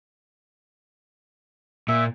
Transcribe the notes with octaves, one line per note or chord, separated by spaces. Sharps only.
A#2 E5